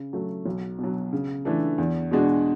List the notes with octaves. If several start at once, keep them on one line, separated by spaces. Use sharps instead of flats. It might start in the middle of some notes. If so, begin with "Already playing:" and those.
Already playing: C#3
F#3 A3
B1
B2 F#3
C#3
E3 A3 D4 A4
E2
B2 G#3 D4 F#4